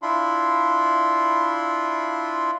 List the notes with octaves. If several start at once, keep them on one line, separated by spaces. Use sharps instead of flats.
D4 E4 F4 B5 C6